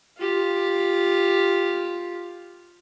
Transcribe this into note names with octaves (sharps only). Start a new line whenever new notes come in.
F4 G4